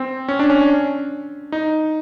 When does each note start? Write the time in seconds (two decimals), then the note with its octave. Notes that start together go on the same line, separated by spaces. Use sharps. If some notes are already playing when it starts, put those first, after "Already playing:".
Already playing: C4
0.28 C#4
0.39 D4
0.50 C#4
1.52 D#4